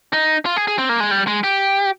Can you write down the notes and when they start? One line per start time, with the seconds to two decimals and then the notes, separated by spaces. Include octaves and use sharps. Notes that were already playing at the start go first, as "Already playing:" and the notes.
0.13 D#4
0.46 F4
0.56 G#4
0.67 G#4
0.78 C4
0.89 A#3
1.00 G#3
1.11 G3
1.27 G#3
1.44 G4